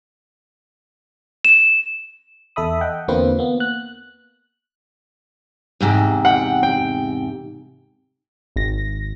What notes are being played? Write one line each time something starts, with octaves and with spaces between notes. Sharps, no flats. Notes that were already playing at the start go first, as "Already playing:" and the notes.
E7
E2 A4 E5 B5 D#6
D#5 F#5 G5
E2 D3 A#3 C4 F4 B4
A#3 B3
F#6
E2 G#2 C3
F#5 G5
G5
G#1 A#6